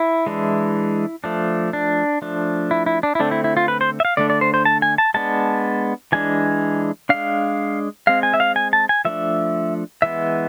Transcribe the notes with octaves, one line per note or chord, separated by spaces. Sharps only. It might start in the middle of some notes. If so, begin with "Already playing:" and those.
Already playing: E4
E3 G#3 D4
F3 A3 D4
D4
F3 A3 D4
E4
E4
D4
E4
D3 A3 C4 D4
E4
E4
F4
B4
C5
E5
F5
D3 A3 D4 D5
D5
C5
C5
A5
G#5
A5
G#3 B3 D4 A5
E3 G#3 D4 G#5
G#3 D4 F5
G#3 C4 F5
G#5
E5
F5
G#5
A5
G#5
F3 A3 D4 E5
E3 G#3 B3 E5